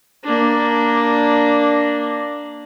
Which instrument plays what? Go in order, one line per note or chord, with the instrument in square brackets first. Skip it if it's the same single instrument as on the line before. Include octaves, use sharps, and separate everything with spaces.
[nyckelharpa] A#3 D4